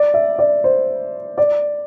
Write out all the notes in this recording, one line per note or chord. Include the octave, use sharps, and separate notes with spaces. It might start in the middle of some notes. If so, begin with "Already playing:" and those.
Already playing: D5
E5
D5
C5
D5